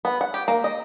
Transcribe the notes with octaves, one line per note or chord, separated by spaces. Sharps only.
B3
F#5
G4
A#3
D#5